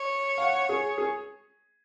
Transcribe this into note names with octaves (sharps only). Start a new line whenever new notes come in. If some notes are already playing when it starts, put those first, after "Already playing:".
Already playing: C#5
F5
F#5
G#4
G#4